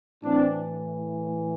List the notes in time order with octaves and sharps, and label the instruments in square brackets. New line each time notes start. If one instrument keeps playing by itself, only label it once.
[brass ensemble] A2 E3 C4 D4